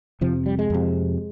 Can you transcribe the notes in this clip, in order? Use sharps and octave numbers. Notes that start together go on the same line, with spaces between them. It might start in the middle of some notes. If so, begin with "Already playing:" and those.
F2 C3 F3
G3
G#3
F2 C3